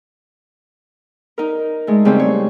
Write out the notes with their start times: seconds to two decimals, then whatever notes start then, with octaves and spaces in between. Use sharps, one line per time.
1.38 D#4 A#4
1.87 G#3 A3
2.05 C#3 G3 C4
2.20 C#5